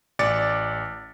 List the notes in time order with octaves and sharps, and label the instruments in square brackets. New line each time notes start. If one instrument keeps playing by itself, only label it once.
[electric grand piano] A1 D5 D6 A6 C#7